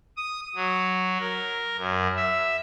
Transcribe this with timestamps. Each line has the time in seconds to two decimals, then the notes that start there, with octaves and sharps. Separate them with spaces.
0.17 D#6
0.55 F#3
1.20 A#4
1.77 F#2
2.16 E5